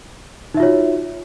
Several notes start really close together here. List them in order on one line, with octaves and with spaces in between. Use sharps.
D#4 E5 F4 C#5 F#4